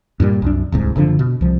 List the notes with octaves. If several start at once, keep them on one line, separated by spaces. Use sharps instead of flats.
G2 A#2 C#3 G3
C2 F#2 D4
D1 C2 G#2
F#1 D3 F3 D4
B2
C2 F3